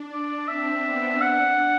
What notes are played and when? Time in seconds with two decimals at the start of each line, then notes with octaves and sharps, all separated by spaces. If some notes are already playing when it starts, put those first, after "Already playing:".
Already playing: D4
0.13 D5
0.48 C4 E5
0.85 B3
1.21 D4 F#5